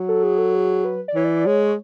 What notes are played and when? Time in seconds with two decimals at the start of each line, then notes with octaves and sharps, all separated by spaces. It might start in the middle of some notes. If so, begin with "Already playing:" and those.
Already playing: F#3
0.09 A4
0.23 G#4
0.38 A4
0.55 G#4
0.85 B4
1.08 D5
1.15 E3 C#5
1.25 D5
1.46 G#3 C#5